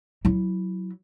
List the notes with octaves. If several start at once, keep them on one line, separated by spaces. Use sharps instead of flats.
F#3 E4